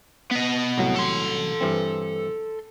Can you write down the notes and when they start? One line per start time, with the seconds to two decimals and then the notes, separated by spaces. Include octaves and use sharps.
0.31 B3 D#5
0.78 C2 A2 F#3
0.96 A4 C6
1.61 G2 E3 C4